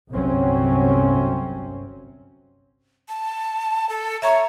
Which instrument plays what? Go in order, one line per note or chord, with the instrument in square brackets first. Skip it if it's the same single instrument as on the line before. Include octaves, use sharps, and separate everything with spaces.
[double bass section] G1 C2 C3 F#3 C4 C#4
[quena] A5
A4
[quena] C#5 [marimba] E5 A#5 C#6